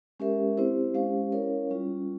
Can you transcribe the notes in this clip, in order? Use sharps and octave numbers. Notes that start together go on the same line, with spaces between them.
G#3 C#4 G4 A#4 E5
C4 E4 G4 C5
G#3 C#4 G4 C5 F5
C#4 E4 A#4 C#5 F5
G3 C#4 F4